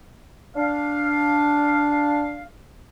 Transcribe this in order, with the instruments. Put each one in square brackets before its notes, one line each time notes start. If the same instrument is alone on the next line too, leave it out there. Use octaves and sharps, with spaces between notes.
[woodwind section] D4 F5